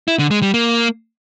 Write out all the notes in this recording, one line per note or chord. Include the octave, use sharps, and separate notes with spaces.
E4
D3
G#3
G3
A#3